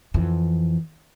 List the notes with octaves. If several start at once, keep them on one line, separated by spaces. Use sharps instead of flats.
F2 E3